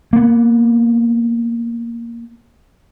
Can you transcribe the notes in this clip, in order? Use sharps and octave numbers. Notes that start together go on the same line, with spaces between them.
A#3 B3